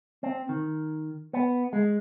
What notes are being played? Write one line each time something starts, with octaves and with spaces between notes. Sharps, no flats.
C4
D#3
B3
G#3